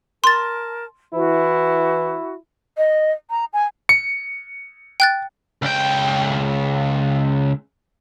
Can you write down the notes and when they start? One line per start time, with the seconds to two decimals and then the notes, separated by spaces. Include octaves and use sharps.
0.24 A#4 A5 C6 A6
1.15 E3 E4 F#4
2.78 D#5
3.30 A#5
3.53 G#5
3.89 C#7
5.00 G5 F#6 A6
5.62 C#2 G5